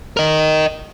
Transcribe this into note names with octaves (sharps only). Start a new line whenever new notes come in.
A#4 D#5